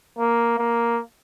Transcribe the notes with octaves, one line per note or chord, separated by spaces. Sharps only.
A#3
A#3